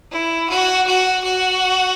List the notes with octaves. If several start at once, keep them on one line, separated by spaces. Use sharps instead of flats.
E4
F#4
F#4
F#4